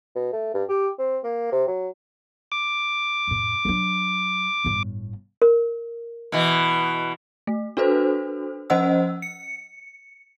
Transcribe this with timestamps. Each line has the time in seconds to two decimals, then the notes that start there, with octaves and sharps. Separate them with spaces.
0.15 B2
0.33 A3
0.54 G2
0.69 G4
0.99 C4
1.24 A#3
1.52 C3
1.67 F#3
2.52 D6
3.27 F2 A2
3.65 F#3 D4
4.64 G1 A2
5.42 A#4
6.32 B2 E3
7.47 A3
7.77 D4 F#4 A4 B4 C5
8.70 F3 C#4 C5 D#5 F#5 E6
9.22 C#7